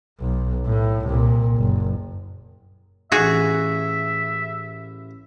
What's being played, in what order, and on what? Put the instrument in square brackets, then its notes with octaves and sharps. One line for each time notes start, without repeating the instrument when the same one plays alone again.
[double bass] B1
A2
C2 A#2
F#1
[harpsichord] A1 F5 A#5 [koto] F#4 G#4 [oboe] E5